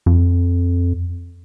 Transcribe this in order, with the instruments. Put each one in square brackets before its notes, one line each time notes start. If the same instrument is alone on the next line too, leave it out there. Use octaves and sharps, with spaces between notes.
[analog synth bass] F2